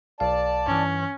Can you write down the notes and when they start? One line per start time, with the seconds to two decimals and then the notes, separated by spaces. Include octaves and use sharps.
0.20 B1 D5 F5 A5
0.67 G2 E3 C#4